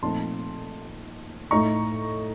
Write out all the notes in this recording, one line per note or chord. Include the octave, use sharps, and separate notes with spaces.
A#2 F3 A3 C4 D#4 A5 C6
A2 A3 D#4 A#5 C#6